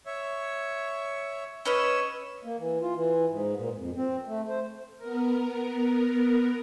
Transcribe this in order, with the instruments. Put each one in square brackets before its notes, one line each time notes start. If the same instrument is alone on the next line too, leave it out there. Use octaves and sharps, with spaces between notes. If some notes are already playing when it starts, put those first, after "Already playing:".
[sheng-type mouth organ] C#5 E5
[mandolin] C#4 B4 D#5 [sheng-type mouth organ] C#5 E6
[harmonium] A#3
E3
F4
E3
G#2
A#2
F2
C4
A3
C5
[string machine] B3 A#4